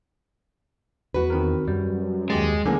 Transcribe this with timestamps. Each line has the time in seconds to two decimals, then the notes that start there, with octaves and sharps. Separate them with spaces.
1.14 E2 F#4 B4
1.30 D#3 C4 A#4
1.68 F#2 G3
2.30 D#2 G#3 G4 A6
2.66 D3 E3 G#3 A#3 C#4